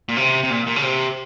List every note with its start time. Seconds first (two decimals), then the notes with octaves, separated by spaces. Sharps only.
0.09 A#2
0.17 C3
0.44 C3
0.50 A#2
0.67 A#2
0.76 C#3
0.83 C3